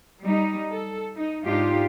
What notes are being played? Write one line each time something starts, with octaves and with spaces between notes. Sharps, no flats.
G3 D#4
A4
D#4
G#2 D4 D#4 F4 G4